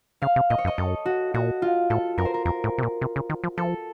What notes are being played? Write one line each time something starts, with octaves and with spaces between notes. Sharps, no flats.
C#3 F5
C3
A#2 D#5
C#5
F#2
D#5
F#2 A4
F#4
A#2 F#4
F4
A2 A4
F#2 A#4
C5
A#4
F2 A#4
A2
C3
A#2
C3
C#3
D#3
F3
F3 A4